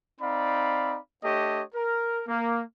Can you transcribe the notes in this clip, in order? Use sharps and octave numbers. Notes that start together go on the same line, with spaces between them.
C4 D#4 D5 F5 B5
A3 D4 G4 C#5 D#5
A#4
A#3